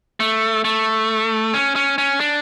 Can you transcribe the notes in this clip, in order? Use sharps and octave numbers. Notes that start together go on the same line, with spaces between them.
A3
A3
C#4
C#4
C#4
D4